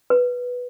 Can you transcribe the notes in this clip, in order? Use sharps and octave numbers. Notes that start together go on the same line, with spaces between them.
B4